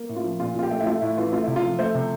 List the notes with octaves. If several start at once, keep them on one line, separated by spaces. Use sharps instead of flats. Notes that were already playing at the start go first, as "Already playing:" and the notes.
Already playing: A#3
A2
F4
F3
A#2 F4
A#2 F4
G4
A3
E4
A3 F4
A2 E4
E3 F4
A3 F4
C3 E4
F4
F3
A3 C5
C3